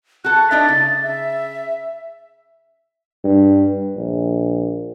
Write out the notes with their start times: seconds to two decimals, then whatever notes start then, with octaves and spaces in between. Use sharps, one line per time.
0.24 F#4 A4 F#6
0.51 D4 D#4 E5 A6
0.68 C#3
1.03 E5
3.24 G2
3.96 A#1